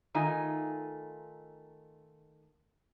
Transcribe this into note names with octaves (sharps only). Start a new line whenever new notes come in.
D#3 A3 D#4 F4 G#5